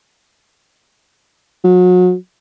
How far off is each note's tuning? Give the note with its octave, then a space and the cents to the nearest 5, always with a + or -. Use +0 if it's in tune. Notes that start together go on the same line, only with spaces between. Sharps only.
F#3 -35